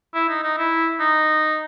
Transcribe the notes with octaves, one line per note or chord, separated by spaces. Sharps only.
E4
D#4
D#4
E4
D#4